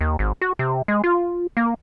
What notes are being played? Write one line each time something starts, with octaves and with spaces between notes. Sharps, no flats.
D#2
G#1
F#4
C3
G#3
F4
A#3